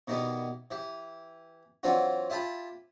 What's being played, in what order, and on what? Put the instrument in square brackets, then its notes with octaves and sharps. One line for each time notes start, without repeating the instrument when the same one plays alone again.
[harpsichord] B2 D#3 E3 G3 B3
E3 G4
E3 F#3 C4 D4 F4 F#4
E4 F4 G4 A5 B5